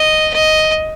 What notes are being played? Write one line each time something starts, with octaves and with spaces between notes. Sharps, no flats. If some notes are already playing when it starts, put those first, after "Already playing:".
Already playing: D#5
D#5